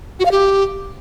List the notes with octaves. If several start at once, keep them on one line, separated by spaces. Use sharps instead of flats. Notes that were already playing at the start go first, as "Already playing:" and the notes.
F#4
F5
G4